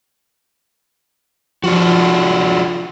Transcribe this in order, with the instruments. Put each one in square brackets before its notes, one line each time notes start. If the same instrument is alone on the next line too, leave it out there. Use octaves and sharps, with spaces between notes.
[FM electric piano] F3 [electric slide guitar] D4 F4 F#4